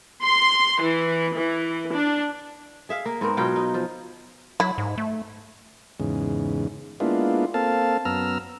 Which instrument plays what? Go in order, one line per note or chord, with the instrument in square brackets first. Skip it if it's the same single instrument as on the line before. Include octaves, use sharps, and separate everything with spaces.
[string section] C6
E3
E3
D4
[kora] G#4 E5 F5
A#3
G#2 B3 C4 A#4
B2 F#3 F4 G5
D#4
F3
[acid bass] F#3 [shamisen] E4
[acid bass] G#2
A3
[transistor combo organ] E2 G#2 C#3
G#3 A#3 B3 D4 E4 F4
A#3 C4 A4 F5 A5
F#2 B3 A#5 E6 F6